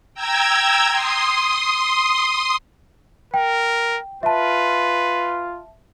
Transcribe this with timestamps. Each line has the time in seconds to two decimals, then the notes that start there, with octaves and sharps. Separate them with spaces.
0.14 G5 A#5 E6 G#6
0.91 C6 D#6
3.34 A#4 G5
4.23 F4 B4 E5 A5